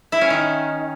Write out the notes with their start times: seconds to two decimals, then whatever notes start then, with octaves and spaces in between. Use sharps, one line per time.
0.12 E4
0.21 C#4
0.30 D#3